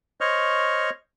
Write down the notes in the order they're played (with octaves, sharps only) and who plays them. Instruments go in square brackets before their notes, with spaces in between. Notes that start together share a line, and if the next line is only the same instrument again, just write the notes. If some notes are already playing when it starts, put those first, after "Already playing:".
[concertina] C5 C#5 D#5 C#6 F6